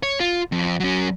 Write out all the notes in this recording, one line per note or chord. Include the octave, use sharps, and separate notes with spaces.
C#5
F4
F2
F#3 C#4